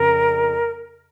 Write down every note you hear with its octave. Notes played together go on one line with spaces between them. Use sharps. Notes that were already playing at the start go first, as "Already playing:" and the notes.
Already playing: F2 C#3 A#4